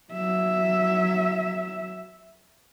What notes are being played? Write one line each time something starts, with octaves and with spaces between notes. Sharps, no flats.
F#3 E5